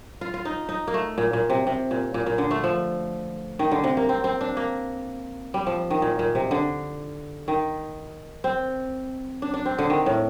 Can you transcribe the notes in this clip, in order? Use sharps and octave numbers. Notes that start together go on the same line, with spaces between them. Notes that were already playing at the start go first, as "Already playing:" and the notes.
F4
F4
D#4
D#4
A#3
A3
A#2
A#2
C3
C3
A#2
A#2
A#2
D3
A3
F3
D#3
D3
C3
A#3
C4
C4
D4
A#3
G3
F3
D#3
A#2
A#2
C3
D3
D#3
C4
D4
D4
C4
D3
D#3
A2